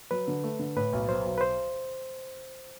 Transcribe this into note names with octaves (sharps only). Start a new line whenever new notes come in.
F#3 B4
D3
A3
D3
A2 B4
B1
F#3 C5
B1
B4
C5